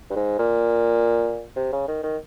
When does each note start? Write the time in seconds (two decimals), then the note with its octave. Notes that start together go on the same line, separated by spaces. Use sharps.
0.10 G2
0.16 G#2
0.39 A#2
1.56 C3
1.72 C#3
1.88 D#3
2.03 D#3